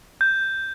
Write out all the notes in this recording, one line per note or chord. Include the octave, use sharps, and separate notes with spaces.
G6